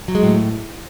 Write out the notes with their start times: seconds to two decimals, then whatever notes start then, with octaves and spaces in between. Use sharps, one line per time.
0.08 F#3
0.15 G#3
0.23 A2